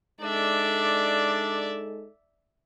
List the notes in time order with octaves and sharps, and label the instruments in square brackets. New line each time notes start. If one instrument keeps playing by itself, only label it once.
[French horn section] G#3 D#4 A4 [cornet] D4 [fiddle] D5 E5